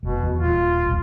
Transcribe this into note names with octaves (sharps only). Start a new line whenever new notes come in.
F1 B2
E2
D#1 F4
D#1 B1